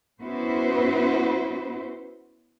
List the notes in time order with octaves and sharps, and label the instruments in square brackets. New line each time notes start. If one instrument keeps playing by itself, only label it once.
[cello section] B3 C#4 E4 F#4 B4 C5